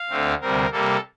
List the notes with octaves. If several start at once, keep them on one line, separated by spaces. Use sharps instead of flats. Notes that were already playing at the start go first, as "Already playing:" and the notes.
Already playing: F5
D2 D3 A3 C4
D2 C3 G3 C4 A#4
C3 G3 A#3 A4